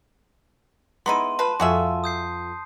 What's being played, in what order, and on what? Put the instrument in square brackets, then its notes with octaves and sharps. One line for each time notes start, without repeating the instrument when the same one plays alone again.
[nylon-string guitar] G#3 [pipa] B3 D#4 E4 [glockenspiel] C6 D#7
[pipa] F4 B4 [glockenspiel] A5
[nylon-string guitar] F2 F4 [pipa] F#4 G#4 E5
[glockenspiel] D#6 G6 C7